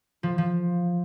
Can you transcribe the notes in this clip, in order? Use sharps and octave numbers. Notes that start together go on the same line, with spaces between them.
F3
F3